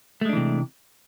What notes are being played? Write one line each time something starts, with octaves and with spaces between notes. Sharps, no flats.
C3 E3 G#3 A3 D4